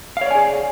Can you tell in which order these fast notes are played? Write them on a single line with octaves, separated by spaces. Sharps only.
F5 C#5 D5 G#5 G#4